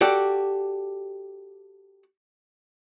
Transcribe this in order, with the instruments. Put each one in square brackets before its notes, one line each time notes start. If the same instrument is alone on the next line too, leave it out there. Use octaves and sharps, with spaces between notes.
[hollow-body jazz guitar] F#4 G4 A4 D5